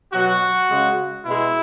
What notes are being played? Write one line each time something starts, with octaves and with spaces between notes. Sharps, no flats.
B2 F#3 F#4
C#3 G#3
B2 G#3 E4